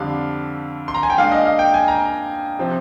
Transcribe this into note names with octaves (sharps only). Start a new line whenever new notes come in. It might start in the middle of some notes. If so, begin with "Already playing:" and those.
Already playing: F2 D3 G3 D4 F5
C6
A#5
G#5
G5
A#2 G#3 D4 F5
D#5
F5
G5
G#5
A#5
C3 F3 C4